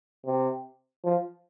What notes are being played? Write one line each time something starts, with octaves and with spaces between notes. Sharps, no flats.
C3
F3